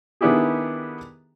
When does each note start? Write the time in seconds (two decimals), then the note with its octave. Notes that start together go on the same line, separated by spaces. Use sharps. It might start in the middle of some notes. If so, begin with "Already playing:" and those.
0.21 D#3 B3 D4 E4 G4 G#4